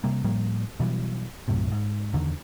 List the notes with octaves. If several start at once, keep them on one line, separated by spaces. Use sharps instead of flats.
C3 G3 A#3
A2 F3 G3 A#3
B2 E3 F#3 G3
B1 F#2 A2 C3
G#2
E2 D3 D#3